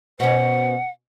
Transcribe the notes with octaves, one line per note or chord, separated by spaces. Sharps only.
B2 C#4 C5 F#5